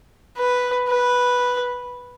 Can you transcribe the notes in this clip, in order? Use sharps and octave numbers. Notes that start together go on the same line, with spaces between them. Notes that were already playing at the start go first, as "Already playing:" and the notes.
B4
B4